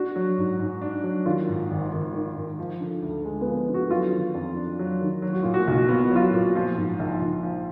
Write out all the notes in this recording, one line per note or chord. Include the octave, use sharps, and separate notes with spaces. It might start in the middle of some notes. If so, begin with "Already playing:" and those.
Already playing: D4 F#4
F#3
G#2
G#2
D4
F#3
D#3 F4
G#2
G#1
G#1
D#3
G#2
F3
D3
D2
G#3
B3
F3
D3
F#4
F#3 F4
D#3
F2
D4
F#3
D#3
F#3
F#4
A#2 F4
F#4
B1
B3 F4
F#3 F4
F#4
A#2
F3 F4
G#2
A#1
A#1
F3